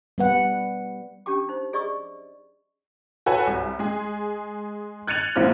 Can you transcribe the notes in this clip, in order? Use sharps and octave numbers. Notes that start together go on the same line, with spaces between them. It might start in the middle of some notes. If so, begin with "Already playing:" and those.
G3 B3 B4 F#5
C#4 D4 G4 G5 D6
D#4 C5
G#4 D5 D#5 C#6 D6 E6
F#4 A4 B4 C#5 G#5
C2
G#3 G#4
F#6 G#6 A6 C#7 D#7 F7
A#1 G#2 A#3 C4 E4 F6